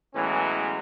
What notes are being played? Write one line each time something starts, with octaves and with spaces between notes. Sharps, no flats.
A2 E3 F#3 G#3 B3 C#4